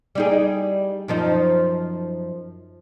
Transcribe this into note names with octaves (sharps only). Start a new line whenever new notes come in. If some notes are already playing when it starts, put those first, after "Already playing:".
G3 D#4 G#4
F#2 F3 D#4